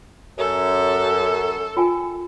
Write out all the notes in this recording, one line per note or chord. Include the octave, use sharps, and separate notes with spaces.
F#2 A4
F4 G5 G#5